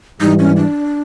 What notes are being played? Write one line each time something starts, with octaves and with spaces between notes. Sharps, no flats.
G#2 E3 G3 D#4
C#4
D4